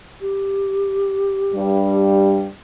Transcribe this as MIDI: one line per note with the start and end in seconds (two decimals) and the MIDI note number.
0.21 2.12 67
1.54 2.48 43
1.54 2.48 55